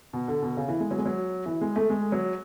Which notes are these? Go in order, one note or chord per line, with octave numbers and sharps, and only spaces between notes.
B2
D3
B2
C#3
E3
G#3
F#3
G#3
F#3
E3
G#3
A3
G#3
F#3